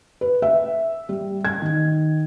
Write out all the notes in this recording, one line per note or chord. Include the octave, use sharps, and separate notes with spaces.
B4
E5
G3
G#6
D#3